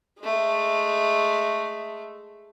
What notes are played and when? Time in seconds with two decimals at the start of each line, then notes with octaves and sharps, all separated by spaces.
0.19 G#3 A3